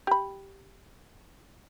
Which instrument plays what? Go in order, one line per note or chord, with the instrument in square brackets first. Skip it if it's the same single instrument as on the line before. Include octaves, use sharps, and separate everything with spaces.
[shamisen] G4 B5